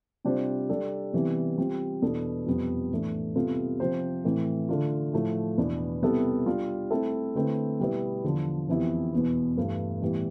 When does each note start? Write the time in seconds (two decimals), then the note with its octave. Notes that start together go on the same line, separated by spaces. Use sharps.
0.25 C3 G3 D4 F4 C5
0.69 G3 D4 A4 D5
1.13 C3 E3 G3 B3
1.58 G3 C4 F4
2.02 E2 B2 B3 D4 A4
2.46 F2 C3 G3 B3
2.91 A2 E3 A3 D4
3.35 C3 G3 B3 F4 A4
3.80 C3 F3 C4 G4 C5
4.24 A2 E3 A3 C4
4.69 D3 A3 D4 F4
5.13 A2 F3 A3
5.58 E2 B2 B3 D4
6.03 C3 G3 B3 E4 A4
6.46 G3 D4 F4
6.91 A3 C4 E4 A4
7.35 D3 A3 C4 E4 B4
7.80 B2 G3 B3 E4 B4
8.24 E2 D3 F3
8.69 F2 E3 B3 E4 G4
9.13 E2 B2 B3
9.58 G2 E3 A3
10.02 A2 E3 G3 B3